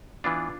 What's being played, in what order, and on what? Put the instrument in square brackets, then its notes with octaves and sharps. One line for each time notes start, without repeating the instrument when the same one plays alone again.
[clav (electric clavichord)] E3 B3 D4 F4